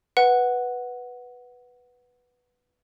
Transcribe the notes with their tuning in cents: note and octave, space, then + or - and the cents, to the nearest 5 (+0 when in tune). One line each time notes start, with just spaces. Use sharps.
B4 +0 F#5 +0